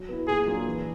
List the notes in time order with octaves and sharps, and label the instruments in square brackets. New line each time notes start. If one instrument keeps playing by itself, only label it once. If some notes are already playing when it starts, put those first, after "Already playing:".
Already playing: [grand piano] F#3
B3 E4
[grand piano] A#2 [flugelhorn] G#4
[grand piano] F#3 A#3 D4 F4
E3